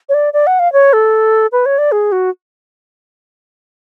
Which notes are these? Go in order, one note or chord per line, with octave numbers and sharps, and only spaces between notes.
C#5
D5
D5
F#5
F5
C#5
A4
B4
C#5
D5
G#4
F#4